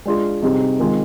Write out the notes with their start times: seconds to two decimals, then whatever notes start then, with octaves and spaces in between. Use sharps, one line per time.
0.05 G#3 D4 F4 G#4
0.42 C3 G3 C4 D#4 G#4
0.79 D#3 G#3 C4 F4